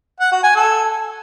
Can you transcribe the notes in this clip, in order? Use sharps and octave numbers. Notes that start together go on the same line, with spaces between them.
F#5
F#4
G#5
A4